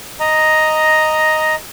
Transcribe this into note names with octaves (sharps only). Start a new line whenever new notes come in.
D#5 A#5